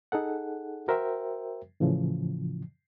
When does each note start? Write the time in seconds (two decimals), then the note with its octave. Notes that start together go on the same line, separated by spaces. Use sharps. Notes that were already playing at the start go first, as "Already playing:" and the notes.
0.12 D#4 G#4 A4 F#5
0.88 F#4 A#4 C5 E5 G5
1.80 A2 C#3 E3 F3